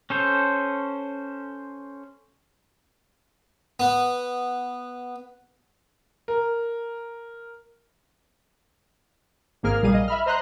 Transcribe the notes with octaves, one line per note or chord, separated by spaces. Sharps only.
C#4 A4 C5
B3
A#4
G#1 G#2 A#3 G#4 A#4 F6
B1 A#2 G3 G#4 F5 D#7
D#5
E5 B5 F6
C5 D#5 A#5 C6 F#6